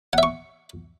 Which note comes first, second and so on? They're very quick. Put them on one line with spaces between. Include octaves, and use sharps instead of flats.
F#5 E5 C#6